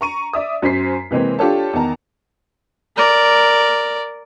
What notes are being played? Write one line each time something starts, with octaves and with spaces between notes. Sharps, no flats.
A#5 C#6 D#7
D5 E5 D#6
F#2 C#4 C5 B6 C7
C3 E3 G#3 A#3 C4
D4 F4 G4 A4 C#5 A5
E2 D#3 A5 A#5
A#4 D5